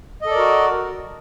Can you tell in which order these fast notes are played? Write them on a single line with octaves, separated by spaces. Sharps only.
D#5 A4 D5 A#4 F#4